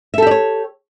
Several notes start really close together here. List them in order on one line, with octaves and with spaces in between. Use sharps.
E5 A4 G4 D5 C#5